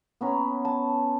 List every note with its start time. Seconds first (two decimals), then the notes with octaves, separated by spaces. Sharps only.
0.21 B3 C#4 A#5
0.65 A5